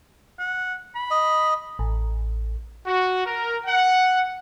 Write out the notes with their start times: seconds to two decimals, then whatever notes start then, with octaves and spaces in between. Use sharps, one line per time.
0.39 F#5
0.95 B5
1.11 D#5
1.79 A1
2.86 F#4
3.26 A#4
3.66 F#5